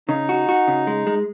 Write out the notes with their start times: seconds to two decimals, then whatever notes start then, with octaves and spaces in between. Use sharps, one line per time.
0.08 C#3 D#4
0.29 F#4
0.49 F#4
0.68 C#3
0.87 G#3
1.07 G#3